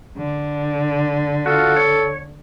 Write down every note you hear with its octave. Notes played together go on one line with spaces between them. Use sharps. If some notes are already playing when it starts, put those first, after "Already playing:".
D3
F4 F#4 A4
C#5